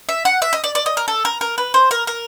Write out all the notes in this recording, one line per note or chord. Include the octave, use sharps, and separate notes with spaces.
E5
F#5
E5
D#5
D5
D5
D#5
A#4
A4
A#4
A#4
B4
C5
A#4
A#4